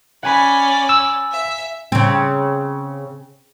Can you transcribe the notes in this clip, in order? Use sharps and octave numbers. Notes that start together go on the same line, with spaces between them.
C#4 D5 F#5 G#5 B5
E6
E5
C#3 C4